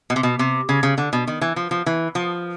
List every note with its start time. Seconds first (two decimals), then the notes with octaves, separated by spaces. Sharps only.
0.10 B2
0.16 C3
0.23 B2
0.39 C3
0.69 C#3
0.83 C#3
0.98 D3
1.13 B2
1.27 D#3
1.41 E3
1.56 F3
1.71 F3
1.86 E3
2.15 F3